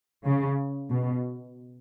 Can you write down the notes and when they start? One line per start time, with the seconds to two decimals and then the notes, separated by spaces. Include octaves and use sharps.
0.25 C#3
0.91 B2